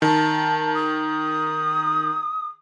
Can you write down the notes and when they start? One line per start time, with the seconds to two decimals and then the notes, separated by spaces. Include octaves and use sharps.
0.02 D#3 A5
0.74 D#6